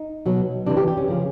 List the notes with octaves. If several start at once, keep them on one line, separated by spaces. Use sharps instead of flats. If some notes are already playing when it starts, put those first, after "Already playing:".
Already playing: D#4
B2 F#3
C3 E3 D4
G4
G4
C#4
C#3 F3